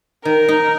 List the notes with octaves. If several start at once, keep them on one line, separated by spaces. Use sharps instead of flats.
D#3 A#4
D#4